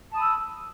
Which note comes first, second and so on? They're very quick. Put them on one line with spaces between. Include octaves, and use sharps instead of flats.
A5 D#6 B5 E6